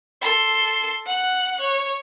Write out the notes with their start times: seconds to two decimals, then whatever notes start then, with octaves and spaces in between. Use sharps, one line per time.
0.21 A4 C6
1.06 F#5 F#6
1.61 C#5